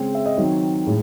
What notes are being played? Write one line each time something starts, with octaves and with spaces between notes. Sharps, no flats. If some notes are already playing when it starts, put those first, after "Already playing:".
Already playing: C#3 G#3 C4
E5
D#5
D#3 F#3 C4 C#5
A2 G#3